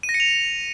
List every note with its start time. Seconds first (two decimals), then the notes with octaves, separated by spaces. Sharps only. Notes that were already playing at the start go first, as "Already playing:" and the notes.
0.03 D#7
0.09 A#6
0.14 C#7
0.20 F7